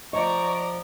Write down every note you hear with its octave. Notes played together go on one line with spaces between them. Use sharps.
F3 D5 D#5 A#5 C#6